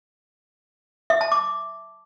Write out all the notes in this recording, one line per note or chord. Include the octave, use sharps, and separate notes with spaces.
E5
A5
D6